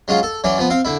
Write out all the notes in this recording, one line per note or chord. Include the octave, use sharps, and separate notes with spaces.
F#3 G#3 C#4 F4
A4
E3 F#3 C#4 D5
F3 B3
C4 F5
D3 E4